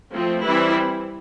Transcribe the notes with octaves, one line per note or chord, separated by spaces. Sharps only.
F3 A3 C4
E3 G3 C4 E4